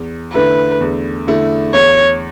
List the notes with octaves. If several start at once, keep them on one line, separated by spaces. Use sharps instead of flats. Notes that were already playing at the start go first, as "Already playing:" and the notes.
Already playing: E2
D3 A3 E4 B4
E2
D3 A3 E4
E2 C#5